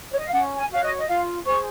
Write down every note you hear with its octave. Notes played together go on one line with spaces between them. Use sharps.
C#5
D#5
F5
C#4 F#5
G#5
F#4 C#5 F5
D#5
D#5
F4 F5
G#4 C5 C#6